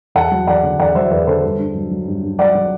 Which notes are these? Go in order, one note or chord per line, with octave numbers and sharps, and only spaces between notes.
E2 F#5 A5
F#3
E2 D5 F#5
D3
E2 D5 F#5
F#3 C5 E5
E2 B4 D5
D3 A4 C5
G2
G2
F#3
F#3
G2
G2
F#3 D5 F#5
F#3